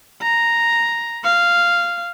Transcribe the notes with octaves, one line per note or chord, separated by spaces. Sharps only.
A#5
F5